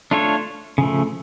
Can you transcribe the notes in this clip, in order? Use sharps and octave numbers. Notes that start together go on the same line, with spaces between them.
A3 D4 F4 A4 C#5
C#3 F3 A3